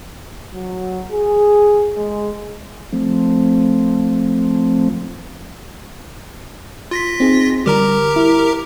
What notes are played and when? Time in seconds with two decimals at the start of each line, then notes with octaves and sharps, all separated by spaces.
0.53 F#3
1.11 G#4
1.96 G#3
2.92 F3 A3 C4
6.91 F4 A#6 B6
7.20 C4 D#4 G#4
7.66 D3 G3 G4 A#4 A#5
8.16 E4